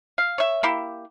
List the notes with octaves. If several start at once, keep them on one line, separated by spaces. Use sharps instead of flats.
F5
C#5 E5
A#3 E4 G4